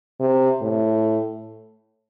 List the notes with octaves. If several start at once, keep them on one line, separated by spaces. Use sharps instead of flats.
C3
A2